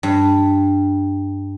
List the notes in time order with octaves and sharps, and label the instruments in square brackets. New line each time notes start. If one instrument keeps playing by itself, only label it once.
[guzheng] G2